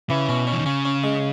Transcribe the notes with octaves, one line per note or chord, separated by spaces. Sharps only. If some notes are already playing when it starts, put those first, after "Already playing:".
C#3 E3
B2 C#4
C#4
E3
D#3
C#3 C#4
C#4
G#3